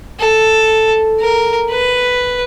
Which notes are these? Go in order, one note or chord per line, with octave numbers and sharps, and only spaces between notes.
A4
A#4
B4